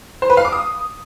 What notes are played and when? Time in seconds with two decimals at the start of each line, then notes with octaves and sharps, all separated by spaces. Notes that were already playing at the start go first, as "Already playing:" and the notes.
0.22 C5
0.30 B4
0.37 F5
0.45 D6
0.52 D#6